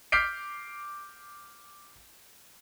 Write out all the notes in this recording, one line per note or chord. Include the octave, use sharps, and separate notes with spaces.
D6 F6 G6 B6 C7 D7